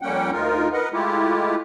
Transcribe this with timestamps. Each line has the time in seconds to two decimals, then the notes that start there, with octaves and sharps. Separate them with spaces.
0.02 F2 G3 A#3 C#4 F#5 G5
0.32 D2 D#4 F4 A#4
0.73 A#4 B4 D#5 F#5
0.93 G#3 A3 E4 F4 G4